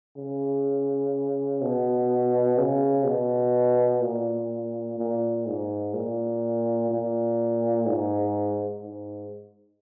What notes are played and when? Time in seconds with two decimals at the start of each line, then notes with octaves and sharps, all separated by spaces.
0.17 C#3
1.62 B2
2.58 C#3
3.05 B2
4.01 A#2
4.98 A#2
5.46 G#2
5.94 A#2
6.91 A#2
7.86 G#2
8.83 G#2